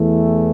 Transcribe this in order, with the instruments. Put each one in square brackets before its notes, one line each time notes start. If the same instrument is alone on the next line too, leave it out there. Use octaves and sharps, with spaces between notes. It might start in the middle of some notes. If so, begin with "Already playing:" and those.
Already playing: [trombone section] E2 E3 A3